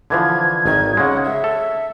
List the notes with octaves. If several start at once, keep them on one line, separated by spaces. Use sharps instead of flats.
D3 E3 F3 G#6
G#1 D#3 G#6
C#3 G#3 F#5
E5
A4